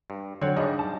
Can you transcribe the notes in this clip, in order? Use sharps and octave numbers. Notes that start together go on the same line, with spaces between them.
G2
D3 F#3 C4 C#5 F#5
G#2 C#3 G3 D4 D#5
A5